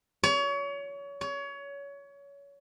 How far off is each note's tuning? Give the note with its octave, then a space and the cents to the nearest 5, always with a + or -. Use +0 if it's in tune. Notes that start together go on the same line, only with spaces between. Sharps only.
C#5 +30
C#5 +25